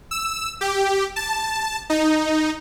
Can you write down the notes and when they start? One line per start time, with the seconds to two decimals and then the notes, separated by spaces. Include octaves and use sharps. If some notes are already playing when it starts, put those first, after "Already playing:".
0.11 E6
0.61 G4
1.16 A5
1.90 D#4